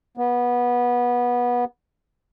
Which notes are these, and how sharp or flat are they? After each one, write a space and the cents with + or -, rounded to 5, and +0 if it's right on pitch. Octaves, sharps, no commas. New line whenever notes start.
B3 -20